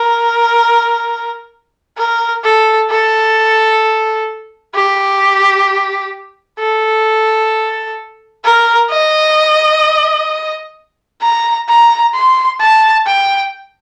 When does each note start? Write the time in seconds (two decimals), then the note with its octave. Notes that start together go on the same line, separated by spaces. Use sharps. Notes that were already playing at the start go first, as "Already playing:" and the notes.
Already playing: A#4
1.98 A#4
2.44 A4
2.91 A4
4.75 G4
6.60 A4
8.45 A#4
8.91 D#5
11.22 A#5
11.69 A#5
12.14 C6
12.61 A5
13.07 G5